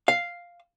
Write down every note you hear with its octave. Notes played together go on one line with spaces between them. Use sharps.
F5